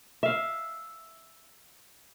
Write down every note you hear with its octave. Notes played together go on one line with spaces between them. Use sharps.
E5 F5